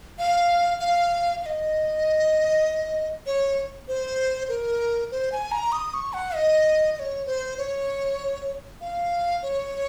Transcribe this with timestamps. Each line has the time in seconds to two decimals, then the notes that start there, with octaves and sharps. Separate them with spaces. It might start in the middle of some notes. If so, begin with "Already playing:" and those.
0.18 F5
0.80 F5
1.42 F5
1.46 D#5
3.26 C#5
3.88 C5
4.49 A#4
5.11 C5
5.32 G#5
5.52 A#5
5.72 D#6
5.94 C#6
6.13 F#5
6.35 D#5
6.95 D#5
6.99 C#5
7.26 C5
7.58 C#5
8.81 F5
9.43 C#5